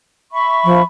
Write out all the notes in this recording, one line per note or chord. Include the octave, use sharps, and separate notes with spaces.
E5 B5 C#6
F3